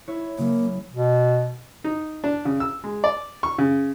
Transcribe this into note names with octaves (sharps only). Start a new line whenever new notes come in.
E4 C#5
C#3 F#3 A#3
B2
D#4
D4
C#3
E6
G#3
D5
C#6
C#3